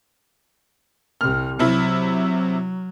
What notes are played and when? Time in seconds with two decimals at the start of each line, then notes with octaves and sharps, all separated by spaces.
1.21 C2 C3 F6
1.59 C3 F#3 E4